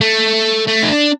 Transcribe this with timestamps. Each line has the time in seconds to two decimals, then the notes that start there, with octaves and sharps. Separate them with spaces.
0.01 A3
0.68 A3
0.83 D#4
0.89 D4